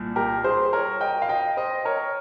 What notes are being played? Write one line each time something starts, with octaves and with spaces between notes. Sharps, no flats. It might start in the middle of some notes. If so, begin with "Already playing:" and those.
Already playing: C2 A#2
G4 A#4
G#4 C5
A#4 C#5
D#5 G5
F5
D#5 G5
C5 D#5
A#4 C#5